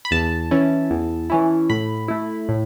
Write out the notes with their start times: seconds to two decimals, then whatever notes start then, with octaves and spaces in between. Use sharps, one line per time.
0.05 B5
0.11 E2 A5
0.51 E3 C#4 E4
0.90 E2
1.30 E3 C#4 E4
1.70 A2 B5
2.08 A3 E4
2.49 A2